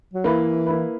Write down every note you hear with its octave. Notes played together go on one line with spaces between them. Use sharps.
F#3
E3 A#3 E4 B4
A#3 E4 B4